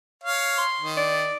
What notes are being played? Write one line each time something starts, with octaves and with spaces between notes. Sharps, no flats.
C#5 F5
C6
D#3
D5